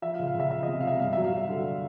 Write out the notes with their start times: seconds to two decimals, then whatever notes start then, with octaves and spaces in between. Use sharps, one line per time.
0.02 F3 E5
0.14 F5
0.19 C#2
0.27 F5
0.35 C#2 E5
0.51 F3 E5
0.63 C3 D#5
0.80 F5
0.84 C3 E5
1.00 G2 F5
1.13 F#3 E5
1.24 F5
1.33 F#3 E5
1.49 D3